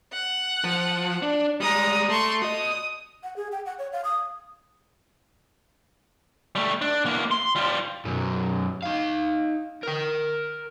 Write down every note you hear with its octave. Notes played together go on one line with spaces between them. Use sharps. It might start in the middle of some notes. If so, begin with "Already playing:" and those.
F#5
F3
D4
G3 G#3 A#5 D#6
A3 C6 C#6
F#4 D#5 D#6
F#5
G#4
G5
F#5
C#5
F5
D#6
G3 A3
D4
E2 A#3
C6
G3 F4
F#2 B2
D#4 F5
A#4 G5